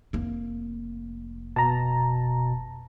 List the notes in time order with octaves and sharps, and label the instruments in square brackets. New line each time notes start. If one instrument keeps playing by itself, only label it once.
[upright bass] F1 A#3
[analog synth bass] B2 [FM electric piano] A5 A#5